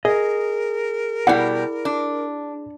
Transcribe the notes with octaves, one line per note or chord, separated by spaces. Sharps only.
G#4 A#4 D#5
B2 G3 E4 D5 F#5
D4